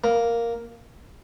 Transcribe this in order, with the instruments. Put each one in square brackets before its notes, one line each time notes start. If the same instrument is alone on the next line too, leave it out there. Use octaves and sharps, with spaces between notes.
[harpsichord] A#3